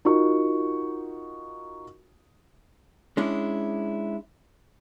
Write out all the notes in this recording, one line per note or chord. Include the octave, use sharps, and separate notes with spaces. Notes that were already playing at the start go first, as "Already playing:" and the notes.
D#4 F4 F#4 A#4 C#6
G#3 C#4 D4 E4